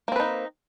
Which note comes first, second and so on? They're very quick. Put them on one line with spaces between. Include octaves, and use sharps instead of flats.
A#3 C4 B4 D#4